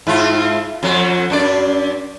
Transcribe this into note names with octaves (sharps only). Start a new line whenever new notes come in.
G#2 E4 F4
F2 F#3
F#2 D4 D5